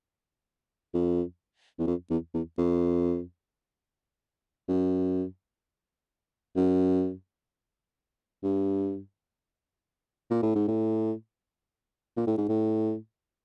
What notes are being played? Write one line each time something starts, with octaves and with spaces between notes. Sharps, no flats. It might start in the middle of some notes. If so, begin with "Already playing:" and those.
F2
E2
F2
E2
E2
F2
F#2
F#2
G2
A#2
A2
G#2
A2
A#2
A2
G#2
A2